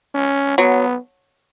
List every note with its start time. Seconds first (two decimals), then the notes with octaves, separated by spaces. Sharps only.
0.15 C#4
0.58 F#3 B3